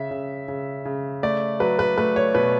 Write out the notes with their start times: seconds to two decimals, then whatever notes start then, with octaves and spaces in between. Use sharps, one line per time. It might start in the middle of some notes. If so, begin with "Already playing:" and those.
Already playing: C#3 E5
0.11 C#3
0.48 C#3
0.85 C#3
1.23 A3 D5
1.60 F#3 B4
1.79 B4
1.98 A3 B4
2.16 C#5
2.35 B2 B4